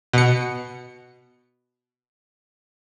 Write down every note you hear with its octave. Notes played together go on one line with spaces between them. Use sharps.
B2 C#7